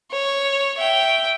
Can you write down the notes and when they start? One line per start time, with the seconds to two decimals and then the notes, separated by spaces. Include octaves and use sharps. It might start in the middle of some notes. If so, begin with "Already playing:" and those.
0.12 C#5
0.77 E5 G5